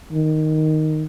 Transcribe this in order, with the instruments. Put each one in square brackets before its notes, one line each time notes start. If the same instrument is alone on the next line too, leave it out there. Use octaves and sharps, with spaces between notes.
[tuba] D#3